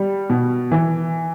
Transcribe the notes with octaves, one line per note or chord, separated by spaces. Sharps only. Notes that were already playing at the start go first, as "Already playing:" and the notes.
Already playing: G3
B2
E3